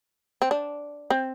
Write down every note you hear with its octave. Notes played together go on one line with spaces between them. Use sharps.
C4
D4
C4